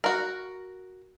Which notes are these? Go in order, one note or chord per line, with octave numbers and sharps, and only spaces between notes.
F#4 A#4